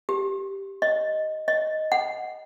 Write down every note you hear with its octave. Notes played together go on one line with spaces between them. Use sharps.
G4
D#5
D#5
F#5